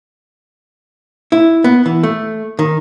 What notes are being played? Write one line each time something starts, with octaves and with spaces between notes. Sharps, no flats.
E4
B3
E3
A3
D#3